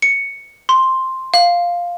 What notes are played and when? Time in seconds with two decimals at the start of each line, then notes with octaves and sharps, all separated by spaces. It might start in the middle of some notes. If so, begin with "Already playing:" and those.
0.02 C#7
0.69 C6
1.34 F5